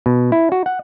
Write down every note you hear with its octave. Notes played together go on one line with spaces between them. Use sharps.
B2
E4
F#4
F#5